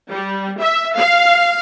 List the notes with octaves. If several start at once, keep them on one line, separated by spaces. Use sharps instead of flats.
G3
E5
F5